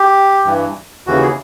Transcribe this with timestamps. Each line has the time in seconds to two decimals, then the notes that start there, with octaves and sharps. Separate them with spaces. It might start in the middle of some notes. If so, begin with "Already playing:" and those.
Already playing: G4
0.45 G2 E3
1.07 D#2 C#3 E3 F#4
1.22 G#4